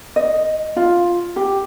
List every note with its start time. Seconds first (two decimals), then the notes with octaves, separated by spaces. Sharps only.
0.16 D#5
0.76 F4
1.36 G4